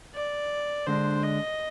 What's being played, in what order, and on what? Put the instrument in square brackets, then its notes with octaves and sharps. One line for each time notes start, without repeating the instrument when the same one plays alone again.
[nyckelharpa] D5
[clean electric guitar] D3 G#3 D4 [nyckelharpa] C5
[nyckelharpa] D#5